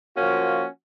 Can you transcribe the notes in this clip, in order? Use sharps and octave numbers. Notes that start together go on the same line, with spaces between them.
F3 A#3 C#4 F#4